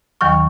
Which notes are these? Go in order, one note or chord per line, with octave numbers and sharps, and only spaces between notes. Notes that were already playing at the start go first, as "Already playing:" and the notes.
D#2 D#3 F#3 C#6 F6